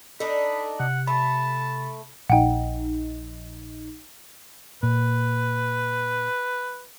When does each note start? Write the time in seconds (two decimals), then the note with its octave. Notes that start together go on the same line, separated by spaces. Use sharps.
0.20 D4 D#4 A4 B5
0.80 C3 F#5
1.07 A3 A5 B5
2.30 A#1 D#4 F#5 G5
4.83 A#2 B4